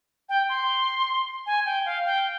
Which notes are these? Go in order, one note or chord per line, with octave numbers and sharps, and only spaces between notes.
G5
C6
G#5
G5
F5
G5